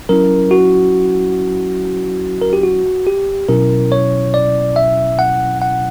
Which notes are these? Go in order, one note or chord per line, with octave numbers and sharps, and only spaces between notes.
F#3 C#4 E4 A#4
F#4
A#4
G4
F#4
G4
B2 F#3 C#4 E4 A#4
C#5
D5
E5
F#5
F#5